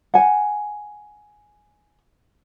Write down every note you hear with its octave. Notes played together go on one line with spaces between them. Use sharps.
F#5 G#5